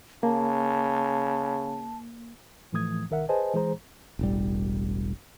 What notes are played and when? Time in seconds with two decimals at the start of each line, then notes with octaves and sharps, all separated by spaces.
0.23 C#3 A#3 A5
2.73 A2 E3 F3 A3 D#6 G#6
3.10 C2 D#3 A#4 E5 F#5
3.29 G#4 B4 C5 D#5 G#5 A5
3.54 E3 G#3 G#4 C5 A#5
4.19 E1 A1 G3